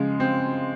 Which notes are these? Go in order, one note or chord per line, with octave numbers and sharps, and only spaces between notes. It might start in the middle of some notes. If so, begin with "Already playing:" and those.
Already playing: C#3 F3 G#3
C4